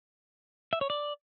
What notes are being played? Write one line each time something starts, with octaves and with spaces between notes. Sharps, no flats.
E5
C#5
D5